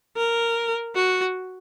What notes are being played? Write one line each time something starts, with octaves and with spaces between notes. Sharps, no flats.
A#4
F#4